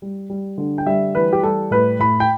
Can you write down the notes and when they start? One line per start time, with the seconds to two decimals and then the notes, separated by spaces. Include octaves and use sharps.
0.02 G3
0.30 G3
0.58 D3
0.78 G5
0.86 G3 E5
1.15 E3 B4
1.33 G4
1.43 G3 A4
1.71 A2 B4
1.99 A2 B5
2.20 G5